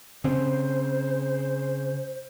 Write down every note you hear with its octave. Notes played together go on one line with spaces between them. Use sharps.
C#3 C4 C5